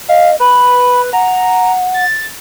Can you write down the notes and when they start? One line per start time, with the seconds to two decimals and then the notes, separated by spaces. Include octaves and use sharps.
0.09 D#5 F5
0.40 B4 B5
1.13 F#5 A#5
1.94 A6